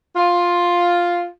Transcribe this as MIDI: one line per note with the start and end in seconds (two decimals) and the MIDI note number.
0.16 1.25 65